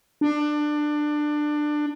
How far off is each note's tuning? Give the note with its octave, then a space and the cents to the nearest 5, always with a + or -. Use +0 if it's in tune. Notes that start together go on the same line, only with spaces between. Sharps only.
D4 +20